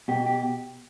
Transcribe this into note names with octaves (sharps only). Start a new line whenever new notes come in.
B2 G4
G4